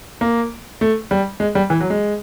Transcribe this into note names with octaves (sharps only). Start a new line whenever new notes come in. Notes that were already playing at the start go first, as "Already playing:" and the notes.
A#3
A3
G3
G#3
G3
E3
F#3
G#3